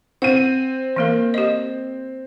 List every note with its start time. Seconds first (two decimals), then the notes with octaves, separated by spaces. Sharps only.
0.22 C4 F#5 D#7
0.96 E3 A#3 A#4
1.34 G4 D#5